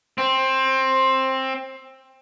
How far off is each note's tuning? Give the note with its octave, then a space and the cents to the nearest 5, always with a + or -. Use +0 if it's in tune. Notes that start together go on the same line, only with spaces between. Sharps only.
C4 +15